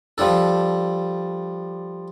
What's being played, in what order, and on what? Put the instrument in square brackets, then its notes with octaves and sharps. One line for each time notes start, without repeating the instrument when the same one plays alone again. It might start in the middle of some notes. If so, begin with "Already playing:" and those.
[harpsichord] F3 G3 D4 A4